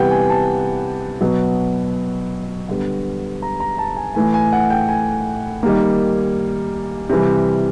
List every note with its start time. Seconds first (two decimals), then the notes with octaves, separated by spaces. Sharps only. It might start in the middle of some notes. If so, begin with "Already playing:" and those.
Already playing: C3 E3 G3 B3 F#5 G5
0.11 G#5
0.29 A5
1.21 B2 F#3 B3
2.68 D3 G3 B3
3.42 A#5
3.60 A#5
3.78 A5
3.97 G#5
4.15 A2 E3 A3 G#5
4.34 G#5
4.53 F#5
4.70 G5
4.89 G#5
5.63 D#3 G3 A#3
7.09 C3 E3 G3